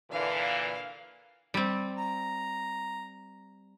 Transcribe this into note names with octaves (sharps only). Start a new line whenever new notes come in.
A#2 D3 E3 F5
G3 C4
A#5